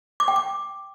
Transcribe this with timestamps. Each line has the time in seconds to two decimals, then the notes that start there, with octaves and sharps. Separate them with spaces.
0.20 D6
0.28 G5
0.36 D6